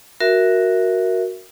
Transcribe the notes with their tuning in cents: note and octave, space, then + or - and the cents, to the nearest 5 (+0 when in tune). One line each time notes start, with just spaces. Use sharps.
F#4 +0 A#4 +0 E5 +0